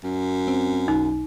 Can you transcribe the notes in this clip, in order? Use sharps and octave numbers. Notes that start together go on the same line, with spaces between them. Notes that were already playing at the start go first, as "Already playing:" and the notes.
F#2
C4
B1 D#4